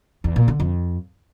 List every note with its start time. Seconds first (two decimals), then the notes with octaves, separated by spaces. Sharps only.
0.24 E2
0.36 A#2
0.48 D3
0.60 F2